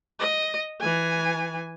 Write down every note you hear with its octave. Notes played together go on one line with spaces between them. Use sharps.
D#5
E3 G#5